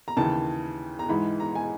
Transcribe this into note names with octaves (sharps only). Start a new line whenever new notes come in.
A#5
D#2 C#3 E3 A5
A#5
G#2 E3 G#3 B5
A#5
G#5